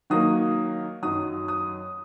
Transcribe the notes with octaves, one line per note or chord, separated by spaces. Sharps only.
D#3 F#3 A#3 D#6
F#2 D#3 F#3 D#6
D#6